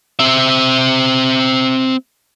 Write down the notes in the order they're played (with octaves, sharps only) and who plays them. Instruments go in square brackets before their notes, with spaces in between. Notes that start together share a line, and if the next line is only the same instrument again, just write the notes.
[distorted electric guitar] C4 E5